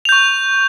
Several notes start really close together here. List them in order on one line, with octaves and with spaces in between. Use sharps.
F7 G6 C#6